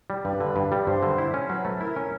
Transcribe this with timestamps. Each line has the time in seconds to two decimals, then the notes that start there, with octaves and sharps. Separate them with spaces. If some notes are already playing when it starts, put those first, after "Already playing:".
0.10 G3
0.25 G2 B4
0.40 D3
0.56 G2
0.72 G3
0.87 G2 C5
1.03 D3
1.18 E4
1.34 C#4
1.49 F#3 B4
1.65 A3
1.80 E4 A#4
1.96 C#4